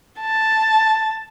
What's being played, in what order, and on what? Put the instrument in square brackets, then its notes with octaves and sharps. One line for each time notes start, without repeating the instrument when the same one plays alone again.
[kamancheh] A5